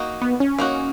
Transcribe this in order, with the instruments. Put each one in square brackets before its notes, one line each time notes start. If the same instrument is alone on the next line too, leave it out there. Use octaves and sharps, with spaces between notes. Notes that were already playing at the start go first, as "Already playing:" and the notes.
Already playing: [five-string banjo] A#3 D#4 F#4
[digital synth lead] B3
C#4
[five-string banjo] A#3 D#4 F#4